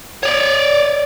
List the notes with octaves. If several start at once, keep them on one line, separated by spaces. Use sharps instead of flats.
C#5 D5